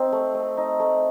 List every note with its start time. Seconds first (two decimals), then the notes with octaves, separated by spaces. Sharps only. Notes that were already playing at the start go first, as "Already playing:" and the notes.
Already playing: C4 D#4
0.12 A3
0.35 A3
0.57 D#4
0.80 A3